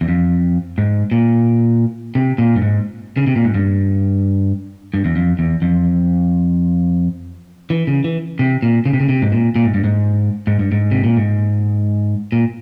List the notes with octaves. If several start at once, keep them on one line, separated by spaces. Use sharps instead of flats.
E2
F2
G#2
A#2
C3
A#2
G2
G#2
C#3
C3
A#2
G#2
G2
G2
E2
F2
E2
F2
E3
C#3
E3
C3
A#2
C#3
C3
C#3
C3
G#2
A#2
A#2
G#2
G2
G#2
G#2
G2
G#2
C3
A#2
G#2
A#2